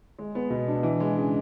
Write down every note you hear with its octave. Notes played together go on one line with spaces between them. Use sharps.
G#3
B3
B2
D4
E3
G#3
C#3